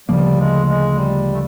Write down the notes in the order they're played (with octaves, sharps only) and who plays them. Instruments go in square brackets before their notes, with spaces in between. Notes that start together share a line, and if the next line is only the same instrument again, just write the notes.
[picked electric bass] D2 C#3 F3 A#3 [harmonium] G3
[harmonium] G#3
G#3
G3
A3